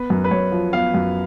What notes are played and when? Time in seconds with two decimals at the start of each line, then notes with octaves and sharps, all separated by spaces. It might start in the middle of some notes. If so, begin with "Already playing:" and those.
Already playing: B3 B4
0.10 F#2
0.24 B4
0.31 F#2 C#5
0.52 F3
0.73 B3 F5
0.94 F#2